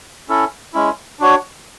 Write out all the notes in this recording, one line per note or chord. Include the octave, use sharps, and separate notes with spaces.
C#4 E4 A4
G#3 C#4 E4
D4 F#4 C#5